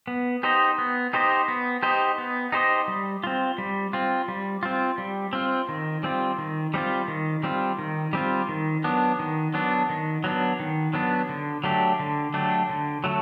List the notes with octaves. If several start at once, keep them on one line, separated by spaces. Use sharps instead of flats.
B3
D#4 G4 C5 D#5
B3
D#4 G4 C5 D#5
B3
D#4 G4 C5 D#5
B3
D#4 G4 C5 D#5
G3
C4 F4
G3
C4 F4
G3
C4 F4
G3
C4 F4
D#3
G3 C4 F4
D#3
G3 C4 F4
D#3
G3 C4 F4
D#3
G3 C4 F4
D#3
F#3 B3 D4
D#3
F#3 B3 D4
D#3
F#3 B3 D4
D#3
F#3 B3 D4
D3
F#3 A3 D4 G4
D3
F#3 A3 D4 G4
D3
F#3 A3